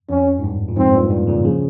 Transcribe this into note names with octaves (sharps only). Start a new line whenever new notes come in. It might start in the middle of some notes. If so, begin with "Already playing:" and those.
F2 C#4
G#2
G2
A#2
F2 G#2 C4
G2 A#2
G2 A#2
A#2 C#3
C#3 F3